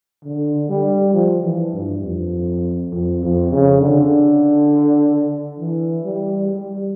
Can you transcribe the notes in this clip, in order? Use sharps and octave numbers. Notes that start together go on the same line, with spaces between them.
D3
G3
F3
E3
G2
F2
F2
F2
C#3
D3
E3
G3
G3